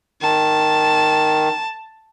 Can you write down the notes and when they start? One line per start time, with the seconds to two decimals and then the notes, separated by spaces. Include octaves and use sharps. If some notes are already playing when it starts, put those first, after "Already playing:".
0.22 D#3 A5